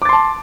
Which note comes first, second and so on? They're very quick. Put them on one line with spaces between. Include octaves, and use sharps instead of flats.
D6 A6 C6 A5